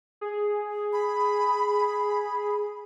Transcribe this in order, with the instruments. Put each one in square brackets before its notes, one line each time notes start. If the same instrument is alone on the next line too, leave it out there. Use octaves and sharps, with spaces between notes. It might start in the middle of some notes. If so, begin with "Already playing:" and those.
[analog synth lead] G#4
[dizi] B5